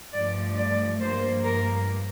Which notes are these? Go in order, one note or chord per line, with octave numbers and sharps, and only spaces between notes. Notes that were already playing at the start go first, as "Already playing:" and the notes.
G2 F3 A3 D5
D5
G2 F3 A#3 C5
A#4